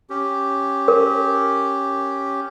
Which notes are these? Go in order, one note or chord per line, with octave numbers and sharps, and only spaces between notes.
C#4 G4
A#4